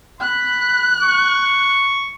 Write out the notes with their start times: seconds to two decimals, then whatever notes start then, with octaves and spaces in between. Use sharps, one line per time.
0.21 B5 F#6
1.02 C#6